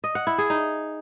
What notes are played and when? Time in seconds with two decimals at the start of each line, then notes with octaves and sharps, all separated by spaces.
0.04 D#5
0.15 F#5
0.27 E4
0.38 G#4
0.50 D#4